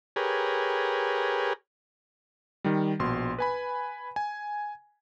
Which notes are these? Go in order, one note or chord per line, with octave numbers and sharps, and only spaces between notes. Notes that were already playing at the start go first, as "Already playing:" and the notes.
G4 G#4 A#4 B4 C#5
D#3 G3
A#1 B2 C6
B4 G#5 B5
G#5